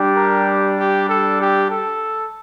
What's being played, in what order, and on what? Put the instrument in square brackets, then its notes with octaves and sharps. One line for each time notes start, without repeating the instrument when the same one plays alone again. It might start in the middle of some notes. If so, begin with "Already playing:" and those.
Already playing: [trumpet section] G3 D4 G4
A#4
G4
A4
G4
A4